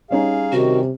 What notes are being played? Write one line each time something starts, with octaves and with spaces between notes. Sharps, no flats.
G3 C#4 D#4 G#4 F5
C3 D#3 F#4